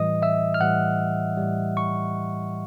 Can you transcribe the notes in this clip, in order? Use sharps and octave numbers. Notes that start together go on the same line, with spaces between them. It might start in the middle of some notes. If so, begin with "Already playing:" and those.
Already playing: A2 E3 G3 D#5 D#6
E5 E6
F6
A2 E3 G3 F#5 F#6
A2 E3 G3
C#6